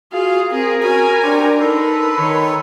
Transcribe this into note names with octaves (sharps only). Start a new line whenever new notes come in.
F4 F#4 G#4 F5
C4 G#4 A#4
C#4 F#4 G#5 B5
D4 G4 C5 C#5
D#4 A4 B4 C6
D#3 C#5